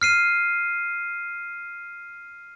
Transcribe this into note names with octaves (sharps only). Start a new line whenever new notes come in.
F6 C7 D#7